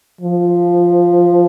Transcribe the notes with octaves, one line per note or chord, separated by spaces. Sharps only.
F3